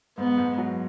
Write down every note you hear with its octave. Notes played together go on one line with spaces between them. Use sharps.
G#2 B3
G#2
F#3